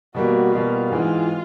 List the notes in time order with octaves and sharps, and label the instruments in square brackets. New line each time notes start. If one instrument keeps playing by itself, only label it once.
[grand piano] B2 G3 A#3 [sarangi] F#4
[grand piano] B2 G3 A#3 [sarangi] F4
[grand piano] G#2 E3 G#3 C4 [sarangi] F4